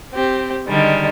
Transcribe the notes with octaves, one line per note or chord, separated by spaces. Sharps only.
C4 G4
D3 D#3 G3 G#3